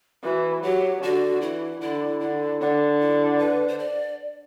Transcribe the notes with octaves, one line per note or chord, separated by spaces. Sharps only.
E3 F#4
F#3 G4
D3 F#4
E3 E4
D3 E4
D3 E4
D3 D4
E4
B4
C5
D5